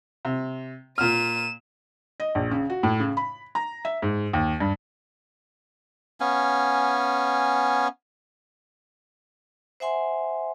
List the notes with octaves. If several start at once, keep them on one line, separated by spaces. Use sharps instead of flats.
C3
A#2 F6 D#7 E7
D#5
A#1
C#3
F#4
A2
C#3
B5
A#5
E5
G#2
D#2
G2
B3 C#4 F5 G#5
C5 E5 F#5 G#5 C6